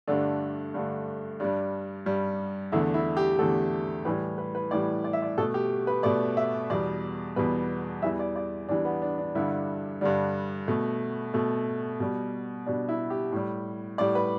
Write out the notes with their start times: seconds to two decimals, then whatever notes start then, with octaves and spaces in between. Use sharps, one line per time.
0.07 G2 D3 A3 D4
0.74 G2 D3 A3
1.40 G2 G3 D4
2.06 G2 G3
2.72 E2 D3 A3 E4
2.94 E4
3.17 G4
3.39 E2 D3 A3 A4
4.05 A2 E3 G3 B4
4.38 B4
4.55 B4
4.71 A2 E3 G3 D5
5.04 D5
5.13 E5
5.22 D5
5.38 B2 A3 A4
5.54 G4
5.87 B4
6.03 B2 A3 D5
6.37 E5
6.70 E2 B2 G3 D5
7.36 E2 B2 G3 B4
8.02 E2 E3 G3 E5
8.19 D5
8.36 D5
8.69 E2 E3 G3 D4
8.85 B3
9.02 D4
9.19 D4
9.35 G2 D3 G3 E4
10.01 G2 D3 G3 D4
10.68 B2 A3
11.34 B2 A3
12.00 B2 G3
12.66 B2 G3 D4
12.89 E4
13.10 G4
13.32 A2 G3
13.98 A2 G3 D5
14.15 B4